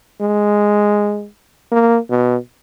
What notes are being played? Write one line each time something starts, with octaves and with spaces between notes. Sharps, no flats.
G#3
A#3
B2